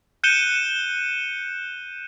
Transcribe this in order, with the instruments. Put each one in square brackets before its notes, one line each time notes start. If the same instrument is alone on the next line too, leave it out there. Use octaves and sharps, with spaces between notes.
[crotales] F#6 G6 C#7 D#7 E7 G7